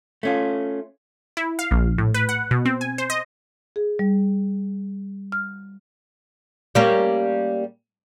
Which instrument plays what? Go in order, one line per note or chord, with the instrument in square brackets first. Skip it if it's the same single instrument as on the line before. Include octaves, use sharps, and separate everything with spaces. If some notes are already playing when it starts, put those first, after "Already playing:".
[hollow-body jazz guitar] A3 C#4 F4
[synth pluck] E4
F5
A#1
A2
B4
F#5
B2
C4
G#5
C5
D#5
[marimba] G#4
G3
F6
[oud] G3 A#3 C#4